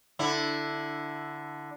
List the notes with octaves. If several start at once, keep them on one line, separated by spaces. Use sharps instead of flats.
D3 E4